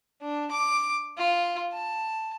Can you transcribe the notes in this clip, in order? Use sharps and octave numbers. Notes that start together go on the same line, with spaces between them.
D4
D6
F4
A5